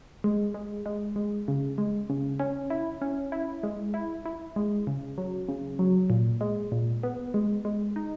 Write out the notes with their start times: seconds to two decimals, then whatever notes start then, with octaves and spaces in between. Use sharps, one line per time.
0.24 G#3
0.54 G#3
0.86 G#3
1.16 G#3
1.48 C#3
1.78 G#3
2.10 C#3
2.40 C#4
2.70 E4
3.02 C#4
3.32 E4
3.63 G#3
3.94 E4
4.26 E4
4.56 G#3
4.87 C#3
5.18 F#3
5.49 C#3
5.79 F#3
6.10 A#2
6.41 G#3
6.72 A#2
7.03 B3
7.34 G#3
7.65 G#3
7.96 D#4